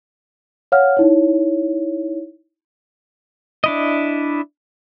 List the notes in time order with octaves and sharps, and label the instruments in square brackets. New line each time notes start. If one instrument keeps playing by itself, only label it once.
[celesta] C#5 F5 F#5 F6
D#4 E4 C#5
[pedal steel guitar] D4 E4 D#5